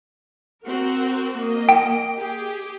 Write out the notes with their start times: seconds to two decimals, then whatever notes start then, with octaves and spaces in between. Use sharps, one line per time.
0.64 C4 F#4 A#4
1.37 A#3 D#5
1.69 G5
2.19 G4 G#4